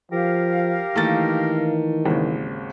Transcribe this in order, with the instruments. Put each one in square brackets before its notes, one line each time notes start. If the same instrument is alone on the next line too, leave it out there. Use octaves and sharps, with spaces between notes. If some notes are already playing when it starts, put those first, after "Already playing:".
[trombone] F3 [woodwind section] G4 A#4 F5
[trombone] D#3 [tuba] E3 [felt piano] A3 A#3 A6
[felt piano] G#1 D#2 C#3